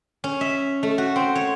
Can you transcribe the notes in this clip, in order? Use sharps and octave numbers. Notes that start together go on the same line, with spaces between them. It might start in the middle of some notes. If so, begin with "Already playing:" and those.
C#4
E5
A3
F#4
C4
C#5